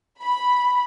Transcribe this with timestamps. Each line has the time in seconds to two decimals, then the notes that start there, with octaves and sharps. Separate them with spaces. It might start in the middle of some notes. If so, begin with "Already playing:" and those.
0.19 B5